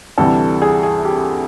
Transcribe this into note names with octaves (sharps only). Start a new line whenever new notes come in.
D2 C3 E3 G3 A4
G#4
G#4
G4